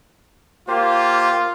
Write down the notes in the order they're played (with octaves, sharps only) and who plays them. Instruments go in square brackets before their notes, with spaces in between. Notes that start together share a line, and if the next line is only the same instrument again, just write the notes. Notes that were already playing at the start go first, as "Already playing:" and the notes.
[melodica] A#3 G4 C5 [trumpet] F4